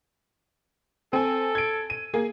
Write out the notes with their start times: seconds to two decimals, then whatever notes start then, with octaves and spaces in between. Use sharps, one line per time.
1.13 C4 A4 G#5
1.55 G#6 D7
1.90 D#7
2.14 A#3 G#4